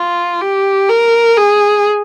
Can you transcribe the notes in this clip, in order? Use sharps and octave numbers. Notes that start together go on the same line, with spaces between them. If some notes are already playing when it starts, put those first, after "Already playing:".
Already playing: F4
G4
A#4
G#4